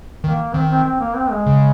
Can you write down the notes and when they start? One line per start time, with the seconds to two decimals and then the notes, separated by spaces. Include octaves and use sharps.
0.24 D#3 A#3
0.54 D#3 C4
0.71 C4
0.85 C4
1.00 A#3
1.16 C4
1.31 G#3
1.46 C#3